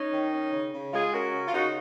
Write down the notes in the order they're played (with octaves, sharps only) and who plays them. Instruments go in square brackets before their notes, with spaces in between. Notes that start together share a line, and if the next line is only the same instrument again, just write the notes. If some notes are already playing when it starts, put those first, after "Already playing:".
Already playing: [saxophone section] C#4 D#4
D#3
C#4
C#3
C#3
G#3 F4 G#4
C#4 F#4 A#4
C#3
F4
C#3 D#4 F#4